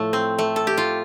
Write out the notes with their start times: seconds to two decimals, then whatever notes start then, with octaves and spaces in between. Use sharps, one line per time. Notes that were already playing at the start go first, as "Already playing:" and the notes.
Already playing: A2 F3 A3
0.13 C4
0.38 A3
0.56 A4
0.67 G4
0.77 F4